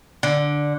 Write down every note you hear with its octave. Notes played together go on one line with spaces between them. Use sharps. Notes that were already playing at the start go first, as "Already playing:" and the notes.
D3